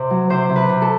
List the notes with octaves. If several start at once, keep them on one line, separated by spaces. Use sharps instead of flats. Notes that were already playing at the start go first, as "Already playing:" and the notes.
Already playing: C3 C5
F#3
C3 C5
C3
B4
C3
A4